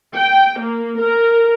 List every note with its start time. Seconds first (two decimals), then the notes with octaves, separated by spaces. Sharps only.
0.15 G5
0.60 A#3
1.00 A#4